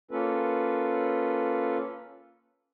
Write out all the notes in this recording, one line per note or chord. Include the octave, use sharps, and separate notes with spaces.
A#3 C#4 F4 A4 B4